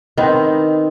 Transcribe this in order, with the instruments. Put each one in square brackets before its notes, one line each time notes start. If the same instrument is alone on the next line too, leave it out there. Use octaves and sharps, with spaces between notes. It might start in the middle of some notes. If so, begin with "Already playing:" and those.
[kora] D#3 B3 C4 D#4